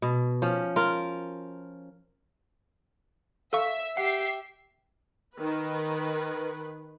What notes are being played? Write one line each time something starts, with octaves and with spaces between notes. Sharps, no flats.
B2
F3 C#4
F4 A#4
A4 E5 F5 C#6
G4 E5 F#5 C7
D#3 B4